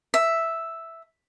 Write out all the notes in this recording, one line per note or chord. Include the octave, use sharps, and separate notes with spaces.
E5